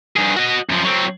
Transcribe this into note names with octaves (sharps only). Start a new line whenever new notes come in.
G2 G#4
F#4 D#5
F#2 F3
F#3 C4